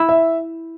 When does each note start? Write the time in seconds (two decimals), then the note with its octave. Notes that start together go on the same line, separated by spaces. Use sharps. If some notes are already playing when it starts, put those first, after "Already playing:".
Already playing: E4
0.09 E5